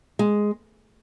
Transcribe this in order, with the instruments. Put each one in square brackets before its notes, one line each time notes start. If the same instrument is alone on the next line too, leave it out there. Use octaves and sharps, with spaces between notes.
[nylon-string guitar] G#3